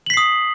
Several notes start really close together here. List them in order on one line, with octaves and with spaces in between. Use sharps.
F#7 B6 C7 D#6